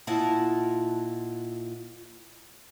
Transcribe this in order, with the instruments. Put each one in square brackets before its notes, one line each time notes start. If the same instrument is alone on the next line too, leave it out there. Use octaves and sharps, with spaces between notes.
[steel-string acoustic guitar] A#2 E4 F4 D#5 F#5 A5